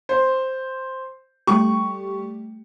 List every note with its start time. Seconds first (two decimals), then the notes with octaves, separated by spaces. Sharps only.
0.09 C5
1.47 G3 A3 G4 C#6